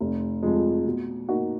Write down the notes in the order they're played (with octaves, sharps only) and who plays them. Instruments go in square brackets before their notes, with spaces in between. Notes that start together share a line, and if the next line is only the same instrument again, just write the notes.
[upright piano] F1
F2 F3 G#3
B2
A#3 D#4 F#4